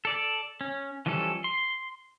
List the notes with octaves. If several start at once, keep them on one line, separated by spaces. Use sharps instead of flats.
A4 D5
C#4
E3 F3 G3 C#4 A4
C6